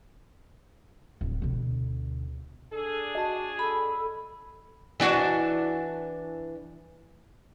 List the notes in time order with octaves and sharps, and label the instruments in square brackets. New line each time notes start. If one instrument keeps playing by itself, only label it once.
[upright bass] D1
D2 B2
[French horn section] D4 G#4 [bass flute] A4
[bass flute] F#4 [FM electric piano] D#5 A5
[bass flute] A4 [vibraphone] B5
[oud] E3 D4 F#4